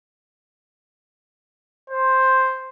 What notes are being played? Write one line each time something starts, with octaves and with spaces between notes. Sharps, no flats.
C5